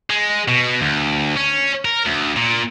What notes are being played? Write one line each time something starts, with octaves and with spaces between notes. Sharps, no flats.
G#3
B2
D2
C#4
A#4
D2
A#2